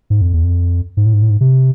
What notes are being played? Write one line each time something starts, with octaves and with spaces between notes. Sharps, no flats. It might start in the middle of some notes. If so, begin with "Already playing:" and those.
G#2
F2
E2
F2
G#2
A2
G#2
A2
G#2
C3